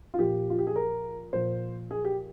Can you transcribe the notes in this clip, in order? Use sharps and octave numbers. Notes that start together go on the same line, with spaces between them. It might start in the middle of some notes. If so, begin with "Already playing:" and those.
F4
A#2 F3 G4
F4
G4
G#4
A#4
A#2 F3 C5
G#4
G4